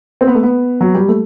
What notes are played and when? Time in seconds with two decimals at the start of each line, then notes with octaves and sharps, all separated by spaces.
0.21 C4
0.27 B3
0.35 A3
0.43 B3
0.81 F#3
0.95 G3
1.08 A3